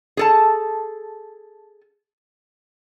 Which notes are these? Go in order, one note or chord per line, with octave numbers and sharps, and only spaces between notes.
G#4 A4 A5